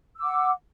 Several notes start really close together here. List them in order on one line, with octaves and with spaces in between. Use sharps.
E6 D6 F#5